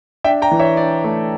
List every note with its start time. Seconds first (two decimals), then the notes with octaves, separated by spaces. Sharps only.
0.24 D4 E5 G5
0.42 G5 A#5
0.51 E3
0.59 C#5 E5
0.77 D4 D5
1.04 A3